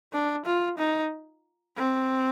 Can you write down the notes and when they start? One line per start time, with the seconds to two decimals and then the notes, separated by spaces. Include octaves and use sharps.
0.13 D4
0.46 F4
0.78 D#4
1.77 C4